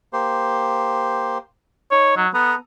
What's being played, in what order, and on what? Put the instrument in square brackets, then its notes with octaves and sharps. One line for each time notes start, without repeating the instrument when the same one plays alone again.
[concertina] A#3 G4 C5
[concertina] D#4 [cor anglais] C#5
[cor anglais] F#3
[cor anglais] B3 [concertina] A4 A#5 D#6